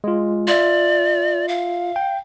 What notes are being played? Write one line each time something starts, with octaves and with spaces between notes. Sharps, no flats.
G#3 F4
F4 D5 E5
F5
G5